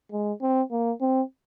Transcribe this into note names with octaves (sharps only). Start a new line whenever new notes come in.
G#3
C4
A#3
C4